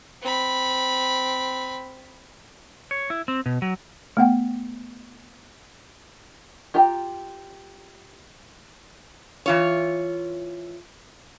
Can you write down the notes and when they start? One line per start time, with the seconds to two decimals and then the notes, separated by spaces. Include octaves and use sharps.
0.22 C4 B5
2.91 C#5
3.10 E4
3.28 C4
3.46 B2
3.62 F#3
4.17 A3 B3 F#5 G5
6.74 F4 G4 G5 A#5
9.46 E3 F4 C#5